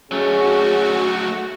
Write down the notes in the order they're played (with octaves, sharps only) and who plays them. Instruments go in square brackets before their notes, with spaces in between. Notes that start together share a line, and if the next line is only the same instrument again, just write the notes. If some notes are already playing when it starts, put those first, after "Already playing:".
[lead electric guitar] F#3 A3 [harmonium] C#4 [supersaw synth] F#4 [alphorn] G#4